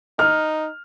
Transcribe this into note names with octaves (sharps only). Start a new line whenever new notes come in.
D#4 F6